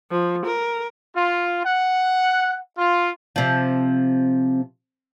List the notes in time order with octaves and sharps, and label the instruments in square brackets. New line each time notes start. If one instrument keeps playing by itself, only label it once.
[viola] F3
A#4
[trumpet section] F4
F#5
F4
[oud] C3 F3